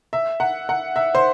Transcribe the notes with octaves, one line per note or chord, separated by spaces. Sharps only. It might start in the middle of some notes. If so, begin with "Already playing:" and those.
E5
F#5
F#5
E5
C5